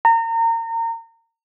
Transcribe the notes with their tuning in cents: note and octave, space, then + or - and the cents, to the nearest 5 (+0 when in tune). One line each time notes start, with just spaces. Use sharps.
A#5 -30